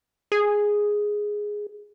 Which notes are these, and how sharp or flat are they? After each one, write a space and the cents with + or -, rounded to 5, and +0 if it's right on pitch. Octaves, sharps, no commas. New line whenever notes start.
G#4 +0